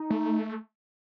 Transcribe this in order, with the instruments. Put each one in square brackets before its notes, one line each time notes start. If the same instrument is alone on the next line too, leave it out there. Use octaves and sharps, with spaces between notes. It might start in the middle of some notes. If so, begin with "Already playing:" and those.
Already playing: [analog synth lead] D#4
[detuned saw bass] A3